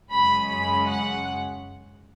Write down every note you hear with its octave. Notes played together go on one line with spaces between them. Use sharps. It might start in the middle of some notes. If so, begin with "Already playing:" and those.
F#2 C#3 G#3 C#4 B5
B5
F#5